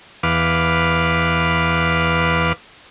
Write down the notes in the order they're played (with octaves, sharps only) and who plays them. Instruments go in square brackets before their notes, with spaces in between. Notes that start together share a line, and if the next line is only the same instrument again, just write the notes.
[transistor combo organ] E2 B4 F5 D6